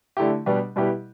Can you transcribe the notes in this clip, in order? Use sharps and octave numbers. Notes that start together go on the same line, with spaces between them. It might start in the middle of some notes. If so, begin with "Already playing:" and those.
D3 A3 E4 G4
B2 G3 D4 G4 B4
B2 G3 E4 G4 B4